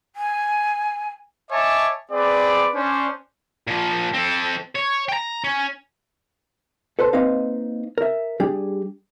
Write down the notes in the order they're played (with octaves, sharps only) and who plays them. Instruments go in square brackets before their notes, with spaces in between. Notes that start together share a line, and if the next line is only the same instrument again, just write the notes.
[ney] G#5
[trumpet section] C#5 D#5 E5 G#5 A5 D6
C4 G#4 B4 D5
C#4 D4 C5
[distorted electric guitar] A#2 F3
C4 A4
C#5
G5 A#5
C#4
[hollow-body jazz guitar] A4 B4 C5 A5
A#3 C4 D#4 B4 D#5 F5
A#4 E5
G3 D4 G4 G#4